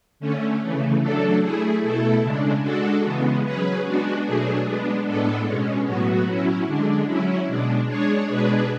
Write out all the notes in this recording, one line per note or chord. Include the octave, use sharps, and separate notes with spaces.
D3 A3 C#4
C#3 E3 A3
F#3 A3 D4 A4
A3 E4 G#4
B2 A3 E4 A4
C#3 G#3 D4
G#3 D4 F#4 A4
C#3 E3 G#3 B3
F#3 C#4 G#4 B4
G#3 B3 D4 F#4
B2 F#3 A3 D4 G#4
G#3 B3 D4
A2 G#3 B3 D4 A4
B2 G#3 C#4
A2 F#3 B3 F#4
F#3 C#4 E4
D3 G#3 D4
F#3 C#4 E4
B2 G#3 D4
G#3 D4 G#4 C#5
B2 G#3 D4 G#4 B4